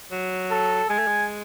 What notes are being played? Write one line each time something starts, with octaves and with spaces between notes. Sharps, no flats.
F#3
A4
G#3 G#5
A3
G#3